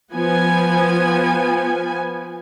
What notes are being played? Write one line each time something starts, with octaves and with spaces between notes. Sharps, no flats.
F3 B3 G#5